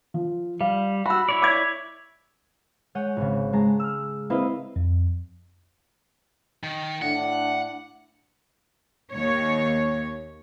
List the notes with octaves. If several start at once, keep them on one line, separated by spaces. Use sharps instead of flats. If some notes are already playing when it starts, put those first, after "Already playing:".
F3
G3 F5
F#4 B5 E6
E4 C#5 D5
D6 G#6
G#3 C#5 F#5 G6 D#7
G#1 C#3
G#3 A5 A#5
E6 F6
A#3 C4 E4 B4 D#5 F5
F2
D#3
A2 D4 F#5
D#2 C#5